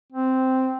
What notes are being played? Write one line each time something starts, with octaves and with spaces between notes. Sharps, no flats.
C4